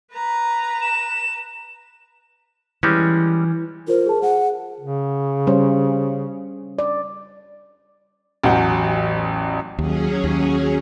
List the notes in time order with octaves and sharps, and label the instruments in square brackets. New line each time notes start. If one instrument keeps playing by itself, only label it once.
[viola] B4 A#5
[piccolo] E7
[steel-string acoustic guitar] E3 [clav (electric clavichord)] G3 G#3 C#4
[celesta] F4 C5 [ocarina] A#4
[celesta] G#4 A5
[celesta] G#4 [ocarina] F#5
[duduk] C#3
[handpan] G3 C#4 C5
D5
[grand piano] A1 E2 F#3 F#5 G6
[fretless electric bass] D#2 [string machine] F#3 C#4 G#4
[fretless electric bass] D#2